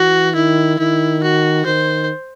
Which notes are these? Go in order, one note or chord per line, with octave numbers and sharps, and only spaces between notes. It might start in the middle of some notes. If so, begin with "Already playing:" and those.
Already playing: E3 F#4
D#3 E4
D#3 E4
F#4
D#3 C5